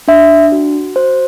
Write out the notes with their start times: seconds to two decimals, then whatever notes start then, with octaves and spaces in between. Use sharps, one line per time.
0.08 D4 E5
0.52 F#4
0.96 F#4 C5